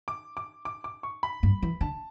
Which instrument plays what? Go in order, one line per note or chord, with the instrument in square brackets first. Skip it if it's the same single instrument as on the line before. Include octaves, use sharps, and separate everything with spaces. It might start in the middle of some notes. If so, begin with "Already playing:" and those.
[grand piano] D6
D6
D6
D6
C#6
B5
[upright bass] G2
E3
[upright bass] D3 [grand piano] A5